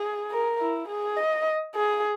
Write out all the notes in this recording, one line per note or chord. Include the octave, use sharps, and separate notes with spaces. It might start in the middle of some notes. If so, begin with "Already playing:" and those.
Already playing: G#4
A#4
E4
G#4
D#5
G#4